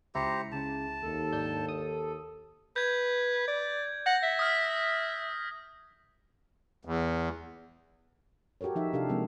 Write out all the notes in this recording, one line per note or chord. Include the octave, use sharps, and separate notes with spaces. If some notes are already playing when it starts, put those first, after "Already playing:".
C#2 E4 G4 C5 A#5 C#7
C#3 A5
D#2 A4
G#1 D4 G6
D#6
B4 G6 G#6
D5
F#5 G6 A#6
E5
D#6 F6 B6
E2
F#4 G4 A4 A#4 C#5
F3 D#4 E5
C3 D4 G4 A4 F5
F3 G#3 A#3 C4 G#4